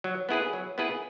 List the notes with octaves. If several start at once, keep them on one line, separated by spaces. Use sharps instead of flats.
F#3
B3 E4 G#4 B4
F#3
B3 E4 G#4 B4